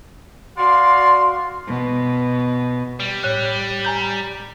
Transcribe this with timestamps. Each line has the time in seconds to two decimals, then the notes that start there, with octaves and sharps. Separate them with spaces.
0.58 F#4 D5 F5 C6
1.67 B2
3.00 G3
3.24 A2 C#5 F#6
3.85 G#5 A#5 G6